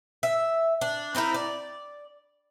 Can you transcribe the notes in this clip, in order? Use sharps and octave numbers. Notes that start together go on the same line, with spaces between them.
E5
D4
C4 D#4 E4 A#4
D5